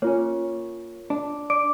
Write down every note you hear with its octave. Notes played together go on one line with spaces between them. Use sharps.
A#3 C#4 F4 C#5
D4
D5 D6 D7